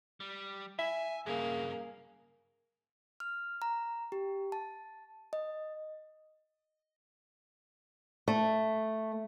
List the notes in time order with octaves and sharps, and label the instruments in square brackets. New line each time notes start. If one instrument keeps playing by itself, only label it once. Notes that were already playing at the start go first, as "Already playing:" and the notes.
[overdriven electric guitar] G3
[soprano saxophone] E5 [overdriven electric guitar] G#5
[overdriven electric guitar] G2 C#3 [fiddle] A#3 [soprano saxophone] G#4
[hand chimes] F6
A#5
G4
A5
D#5
[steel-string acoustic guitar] A3